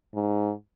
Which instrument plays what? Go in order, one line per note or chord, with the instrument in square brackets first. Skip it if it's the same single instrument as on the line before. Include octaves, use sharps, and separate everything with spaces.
[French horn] G#2